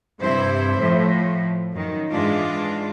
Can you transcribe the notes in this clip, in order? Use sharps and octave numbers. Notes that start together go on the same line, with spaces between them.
G2 C3 E4 C5
A2 F3
F#2 D#3
G#2 E3 G#3 D4 F4